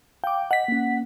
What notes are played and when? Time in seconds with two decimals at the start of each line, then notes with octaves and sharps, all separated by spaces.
0.24 F5 G5 D6
0.51 D#5 F#5 B6
0.68 A#3 C#4